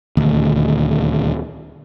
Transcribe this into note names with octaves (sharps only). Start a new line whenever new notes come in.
D#1 D2